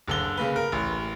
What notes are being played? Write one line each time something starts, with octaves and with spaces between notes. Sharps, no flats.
F#1 D3 G7
C#3 A#3 B4
A#4
A1